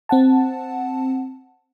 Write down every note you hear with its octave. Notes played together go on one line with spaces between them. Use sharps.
C4 F#5 A5